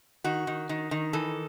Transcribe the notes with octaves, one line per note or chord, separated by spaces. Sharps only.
D#3 F#4
D#3
D#3
D#3
E3 A4